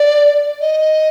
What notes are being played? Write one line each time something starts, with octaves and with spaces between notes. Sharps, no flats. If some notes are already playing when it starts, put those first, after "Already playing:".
Already playing: D5
D#5